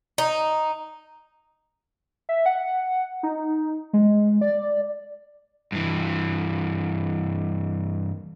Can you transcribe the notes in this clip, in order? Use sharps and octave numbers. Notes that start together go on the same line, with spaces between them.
D#4
E5
F#5
D#4
G#3
D5
G2 E3